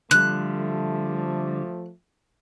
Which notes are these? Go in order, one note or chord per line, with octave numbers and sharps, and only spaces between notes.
D3 F3 G3 A3 F#6